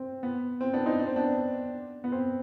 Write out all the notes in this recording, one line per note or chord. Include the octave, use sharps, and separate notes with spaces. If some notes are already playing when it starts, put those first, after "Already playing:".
Already playing: C4
B3
C4
B3 D4
C4 D#4
D4
C4
B3 D4
B3
C4